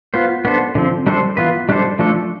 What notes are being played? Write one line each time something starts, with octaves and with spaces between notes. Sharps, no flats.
B3 F4 C5
B3 D4 A4 C5
D3 F3 C4
G3 D4 A4 C5
E3 B3 F4 B4
G3 D4 A4 C5
F3 A3 D4 A4